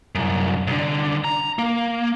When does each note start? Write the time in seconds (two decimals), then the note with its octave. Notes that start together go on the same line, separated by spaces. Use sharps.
0.15 C2 F#2
0.67 C2 D3
1.24 A#5
1.59 A#3